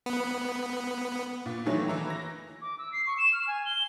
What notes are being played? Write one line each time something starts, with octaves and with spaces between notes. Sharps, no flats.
B3
A#2
D#3 E3 F#3 A3
E3 E4 A#5
A#6
D6
E6
C7
C#6
E7
F6
G#5
G7